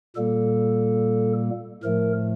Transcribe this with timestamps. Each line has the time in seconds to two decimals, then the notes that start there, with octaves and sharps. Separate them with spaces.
0.16 A#2 G3 A#3 A4
1.83 A2 F3 A3 A#4